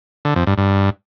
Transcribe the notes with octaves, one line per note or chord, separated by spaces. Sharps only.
D3
F2
G2
G2